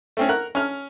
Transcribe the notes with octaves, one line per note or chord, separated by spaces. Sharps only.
A3 C4 C#4
A#4 F#5
C#4 F6